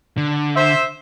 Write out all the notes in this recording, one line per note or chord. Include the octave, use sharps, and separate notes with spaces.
D3
C5 E5